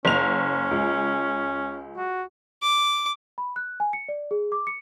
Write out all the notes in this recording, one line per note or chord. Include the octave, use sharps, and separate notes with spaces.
F#1 C#4 F7
C#2
F#4
D6
B5
F#6
G#5
C#7
D5
G#4
D6
C#7